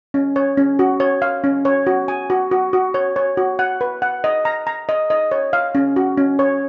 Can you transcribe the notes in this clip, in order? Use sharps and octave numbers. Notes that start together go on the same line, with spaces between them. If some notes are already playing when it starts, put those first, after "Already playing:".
C#4
C#5
C#4
F#4
C#5
F5
C#4
C#5
F#4
G#5
F#4
F#4
F#4
C#5
C#5
F#4
F#5
B4
F#5
D#5
A#5
A#5
D#5
D#5
C#5
F5
C#4
F#4
C#4
C#5